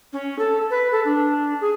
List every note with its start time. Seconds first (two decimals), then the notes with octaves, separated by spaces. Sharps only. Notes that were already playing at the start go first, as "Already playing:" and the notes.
0.12 C#4
0.38 A4
0.70 B4
0.91 A4
1.04 D4
1.60 G#4